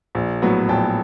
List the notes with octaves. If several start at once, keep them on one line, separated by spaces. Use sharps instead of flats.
A#1
A2 F#3 B3
A#1 G5 A5